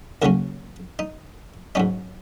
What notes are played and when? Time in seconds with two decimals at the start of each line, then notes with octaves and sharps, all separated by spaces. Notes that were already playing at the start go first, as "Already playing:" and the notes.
0.22 D#2 C#3 F#3 C#4 A#4
0.99 D#4
1.75 G#2 F#3 C#4 D#4